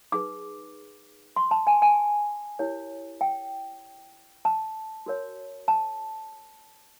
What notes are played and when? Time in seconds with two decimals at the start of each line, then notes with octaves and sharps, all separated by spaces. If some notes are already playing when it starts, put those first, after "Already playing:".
0.12 D#4 G#4 B4 D6
1.36 C6
1.51 A5
1.67 G#5
1.82 G#5
2.59 E4 G4 A#4 C#5
3.21 G5
4.45 A5
5.06 F#4 A#4 C#5
5.68 A5